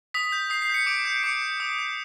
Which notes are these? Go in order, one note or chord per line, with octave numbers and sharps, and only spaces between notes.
D#6 B6
G6
D#6 C7
C7
G6 C#7
D6 D7
G6
D6 C#7
G6
D#6
G6